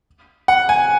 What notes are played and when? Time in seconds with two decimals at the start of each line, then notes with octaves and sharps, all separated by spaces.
0.48 F#5
0.69 G#5